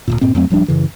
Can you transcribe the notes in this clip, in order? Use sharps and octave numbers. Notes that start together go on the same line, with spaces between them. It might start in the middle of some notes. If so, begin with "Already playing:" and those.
D1 G2 A#2
G2 A#2 C4
F2 F#3 A3 C4
D1 F3 G3 D4
F#2 C#3 E3